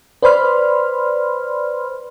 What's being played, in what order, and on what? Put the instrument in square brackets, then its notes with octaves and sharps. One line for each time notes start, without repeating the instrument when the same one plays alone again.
[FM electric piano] B4 C5 D5 B5 C6 F6